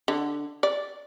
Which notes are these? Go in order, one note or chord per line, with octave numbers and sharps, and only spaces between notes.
D3
D5